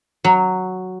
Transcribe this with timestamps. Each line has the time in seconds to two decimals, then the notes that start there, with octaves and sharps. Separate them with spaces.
0.25 F#3